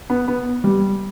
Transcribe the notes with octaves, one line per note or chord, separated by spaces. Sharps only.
B3
B3
G3